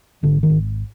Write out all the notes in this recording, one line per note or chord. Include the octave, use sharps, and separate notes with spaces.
G#1 D3
D#3
G#1